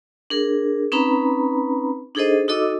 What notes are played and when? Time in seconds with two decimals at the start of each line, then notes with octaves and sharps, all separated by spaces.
0.30 D4 G#4 A#4
0.92 C4 C#4 D#4 B4 A#5 B5
2.15 D4 D#4 G#4 A4 C5 D#5
2.48 D#4 F#4 A4 D#5 D6 E6